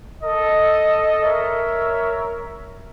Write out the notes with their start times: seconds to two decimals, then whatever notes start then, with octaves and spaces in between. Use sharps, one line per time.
0.22 A4 D#5
1.24 A#4 C#5 E5